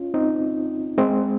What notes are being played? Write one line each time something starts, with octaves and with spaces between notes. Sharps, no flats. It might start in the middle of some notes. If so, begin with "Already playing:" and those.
Already playing: C#4 F4
C4 D#4
G#3 C4